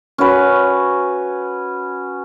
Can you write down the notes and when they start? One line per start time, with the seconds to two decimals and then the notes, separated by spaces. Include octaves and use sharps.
0.18 C#4 F#4 B4